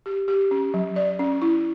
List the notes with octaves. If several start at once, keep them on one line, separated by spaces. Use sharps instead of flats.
G4
G4
C#4
F#3
D5
C#4
E4